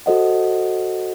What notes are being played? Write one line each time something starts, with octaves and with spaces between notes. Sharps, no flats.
F#4 A4 C5 D#5 F#5